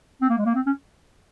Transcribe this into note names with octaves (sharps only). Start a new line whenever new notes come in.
C4
A#3
G#3
A#3
C4
C#4